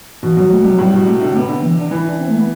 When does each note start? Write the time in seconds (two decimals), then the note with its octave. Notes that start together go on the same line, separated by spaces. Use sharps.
0.23 B2 E3
0.37 B2 F#3
0.50 A3
0.61 C3 G3
0.72 F#3
0.79 A2 G3
0.93 B2
1.06 C3 A3
1.21 D3
1.35 C3 B3
1.48 D3
1.63 E3
1.77 D4
1.91 E3 E4
2.05 D4
2.19 C4
2.29 A3
2.37 B3